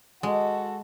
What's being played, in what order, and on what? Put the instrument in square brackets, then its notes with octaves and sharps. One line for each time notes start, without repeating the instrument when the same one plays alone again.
[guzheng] G#3 [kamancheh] F#4 A4